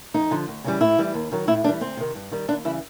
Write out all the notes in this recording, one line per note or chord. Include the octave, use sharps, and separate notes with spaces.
F2 D#4
D3 F3
D2
C#3 E3 G3
A2 E4
E3 G3
D#2
D#3 F#3
A2 E4
E3 G3 D4
D2 C4
C3 D#3
G2
D#3 G3
D#2 D4
C#3 E3 G3 E4